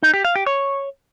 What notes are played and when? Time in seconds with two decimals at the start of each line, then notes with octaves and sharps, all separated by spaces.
0.03 D#4
0.14 G4
0.25 F5
0.36 G4
0.47 C#5